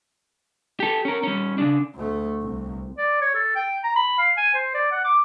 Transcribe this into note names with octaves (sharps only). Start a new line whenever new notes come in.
G4 A4
C#4 A#4
G3 C#4
C#3 D4
D2 A3
C2
D5
C#5
A4
G5
A#5
B5
F5
G#5
C5
D5
F#5
D6